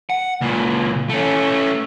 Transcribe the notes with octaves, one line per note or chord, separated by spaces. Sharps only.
F#5
C#2 A#2
A3 C#4